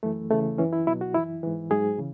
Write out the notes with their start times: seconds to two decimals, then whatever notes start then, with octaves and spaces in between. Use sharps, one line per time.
0.03 F#2 E3 A3
0.30 E2 C#3 E3 A3
0.58 F#2 E3 C#4
0.73 E4
0.87 C#2 B2 F#3 E4
1.01 F#4
1.14 F#2 E3 E4
1.43 G#2 E3
1.70 G#2 F#3 G#4
1.99 C#3 E3